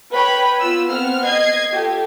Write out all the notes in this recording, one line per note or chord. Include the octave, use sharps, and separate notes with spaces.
B4 C#5 G5 B5
B3 F4 E6
B3 C4 F#5 F6
D#5 G#6 C7
F4 G4 A4